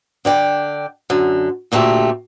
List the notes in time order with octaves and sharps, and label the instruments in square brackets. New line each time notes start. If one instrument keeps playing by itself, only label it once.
[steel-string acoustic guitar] D3 D5 G5
F#2 D3
D2 A#2 A3 F4 G4 E5